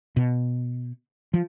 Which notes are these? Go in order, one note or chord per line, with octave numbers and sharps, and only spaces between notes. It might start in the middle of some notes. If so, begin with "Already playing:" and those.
B2
F3